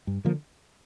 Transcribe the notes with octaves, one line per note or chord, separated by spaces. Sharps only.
G2
D3 F3 A#3